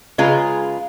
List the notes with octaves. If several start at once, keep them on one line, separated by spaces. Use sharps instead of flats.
C#3 G#3 F4 G#4 B4 A#5